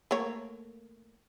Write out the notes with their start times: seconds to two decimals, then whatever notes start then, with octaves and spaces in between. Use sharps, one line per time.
0.11 A3 A#3 C#5